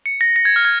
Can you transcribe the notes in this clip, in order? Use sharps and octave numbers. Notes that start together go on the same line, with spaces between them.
C#7
A#6
A#6
G#6
F6
G#6